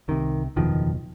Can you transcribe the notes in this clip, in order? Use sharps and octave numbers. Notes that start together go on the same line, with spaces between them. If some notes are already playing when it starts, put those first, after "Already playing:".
C2 C3 D#3
F#1 E2 B2 D#3 F3